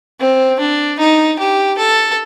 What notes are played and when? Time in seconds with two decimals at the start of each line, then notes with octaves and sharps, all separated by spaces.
0.20 C4
0.60 D4
0.99 D#4
1.39 G4
1.78 A4